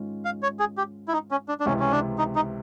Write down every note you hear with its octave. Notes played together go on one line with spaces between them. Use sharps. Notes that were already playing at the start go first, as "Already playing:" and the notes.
Already playing: G#2 D#3 G#3 C#4 F4
F5
C#5
G#4
G4
E4
D#4
C#4
D4
D4
C#2 C3 E3 C#4
C#4
D4
D#4
D#4